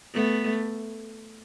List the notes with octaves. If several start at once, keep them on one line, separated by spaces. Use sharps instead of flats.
A3 B3